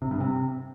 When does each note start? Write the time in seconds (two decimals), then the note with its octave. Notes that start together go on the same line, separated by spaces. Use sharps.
0.02 C3
0.11 G2
0.20 C3